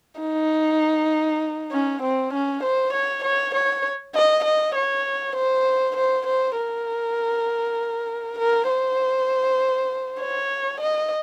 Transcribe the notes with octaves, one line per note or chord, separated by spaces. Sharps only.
D#4
C#4
C4
C#4
C5
C#5
C#5
C#5
D#5
D#5
C#5
C5
C5
C5
A#4
A#4
C5
C#5
D#5